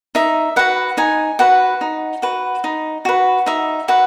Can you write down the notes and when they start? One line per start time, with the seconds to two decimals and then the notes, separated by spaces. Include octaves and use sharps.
0.15 D#4 E5
0.56 F#4 B4 F#5
0.97 D#4 G#5
1.39 F#4 B4 F#5
1.81 D#4
2.22 F#4 B4
2.64 D#4
3.05 F#4 B4
3.46 D#4 E5
3.88 F#4 B4 F#5